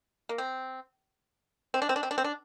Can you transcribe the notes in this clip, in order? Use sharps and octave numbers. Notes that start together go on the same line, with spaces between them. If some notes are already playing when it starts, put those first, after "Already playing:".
A#3
C4
C4
D4
C4
D4
C4
D4
C4
D4